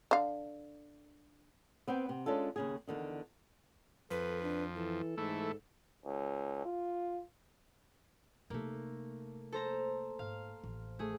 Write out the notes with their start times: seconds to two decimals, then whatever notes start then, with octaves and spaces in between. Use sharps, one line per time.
0.11 D3 F5
1.88 B3 C4 B4 G5
2.09 C3
2.26 G#3 C#4 D4 F4 A4
2.56 D#2 C#3 G#4
2.87 E2 G2 D3 D#3
4.10 F2 A4 B4
4.42 D4
4.75 E3 A4
5.18 G#2 E3 A3
6.05 C#2
6.65 F4
8.50 C3 A3 A#3 D#4
9.52 A4 C5 A#5
10.19 G#2 F5
10.64 A1
10.99 A3 G#4